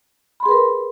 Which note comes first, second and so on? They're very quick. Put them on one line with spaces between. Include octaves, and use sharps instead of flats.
B5 C6 G#4 B4 A#4